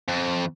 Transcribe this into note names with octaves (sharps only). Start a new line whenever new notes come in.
F2